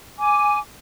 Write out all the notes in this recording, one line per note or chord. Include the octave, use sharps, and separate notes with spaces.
G#5 D6